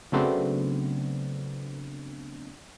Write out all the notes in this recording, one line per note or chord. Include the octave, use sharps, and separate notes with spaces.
C#3 F#3 A3 B3 C4 D4